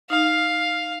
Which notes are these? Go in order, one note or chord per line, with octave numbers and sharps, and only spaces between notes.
D#4 F5 F6